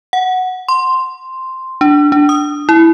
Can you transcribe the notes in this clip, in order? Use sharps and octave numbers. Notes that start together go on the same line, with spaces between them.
F#5
C6
D4
D4
D#6
E4